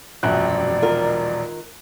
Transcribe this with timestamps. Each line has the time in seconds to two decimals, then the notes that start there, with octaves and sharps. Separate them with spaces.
0.23 E1 A#1 F#2 D5 F#6
0.82 D#3 F4 A#4